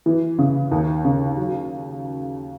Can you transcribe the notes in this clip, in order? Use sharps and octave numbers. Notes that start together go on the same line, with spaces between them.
E3
C#3
D#2
C#3
F#3